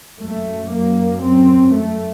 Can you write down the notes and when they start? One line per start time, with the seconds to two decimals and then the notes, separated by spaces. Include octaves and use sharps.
0.19 F#2 A3
0.72 A#3
1.23 C4
1.76 A3